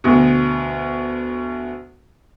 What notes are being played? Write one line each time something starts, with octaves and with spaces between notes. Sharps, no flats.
D2 B2